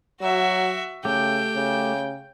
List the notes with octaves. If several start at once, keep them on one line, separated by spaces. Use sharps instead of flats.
F#3 F#4 E5
C#3 A3 G4 G5
C#3